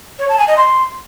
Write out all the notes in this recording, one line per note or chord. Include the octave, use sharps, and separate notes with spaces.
C#5
A5
G#5
D#5
C6